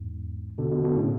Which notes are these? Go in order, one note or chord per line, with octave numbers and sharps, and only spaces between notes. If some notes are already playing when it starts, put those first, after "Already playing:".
Already playing: E2 G#2
B2 D3
B2 D3
B2 D3
A2 C#3